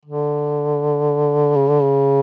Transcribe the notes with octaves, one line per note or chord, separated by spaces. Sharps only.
D3
C#3
D3
C#3